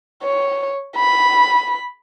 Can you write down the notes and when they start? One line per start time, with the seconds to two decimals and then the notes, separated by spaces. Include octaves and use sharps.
0.23 C#5
0.96 B5